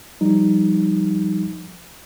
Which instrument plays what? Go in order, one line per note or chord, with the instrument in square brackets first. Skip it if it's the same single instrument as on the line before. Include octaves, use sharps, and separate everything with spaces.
[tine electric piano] F3 G3 D#4